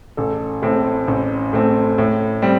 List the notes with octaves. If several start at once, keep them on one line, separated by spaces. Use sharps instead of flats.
A1 A4
A2 A3 C4
A1
A2 A3 C4
A2
G3 C4